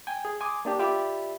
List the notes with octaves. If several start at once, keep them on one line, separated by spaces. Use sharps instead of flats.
G5 G#5
G#4
G#5 C6 D6 D#6
A#3 D4 G4
F4 G4 D5 E5 B5